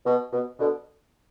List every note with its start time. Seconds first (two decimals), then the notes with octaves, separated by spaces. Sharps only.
0.05 B2
0.32 B2
0.58 B2 D3